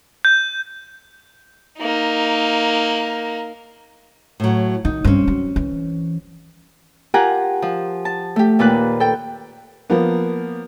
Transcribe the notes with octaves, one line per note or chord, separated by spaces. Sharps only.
G6
A#3 D#4
A2 F#3
D#3 D#4
G2 C4 C#4
F#3
E3
F4 G4 A#4 F#5 G#5 A#5
F3
A5
A3 G4
D#2 A#2 F4 B4 F#6
A4 G5
F3 A#3 B3